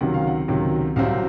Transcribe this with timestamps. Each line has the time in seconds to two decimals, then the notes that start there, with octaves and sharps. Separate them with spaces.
0.01 C#2 C3 D#3 F#3 F#5
0.14 F5
0.27 F#5
0.48 C#2 C3 D#3 F#3
0.96 C2 C3 F#3 C4 F5